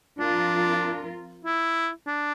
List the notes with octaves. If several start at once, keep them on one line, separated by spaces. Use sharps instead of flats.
F3 C4 D4 F4 A#4
E4
D4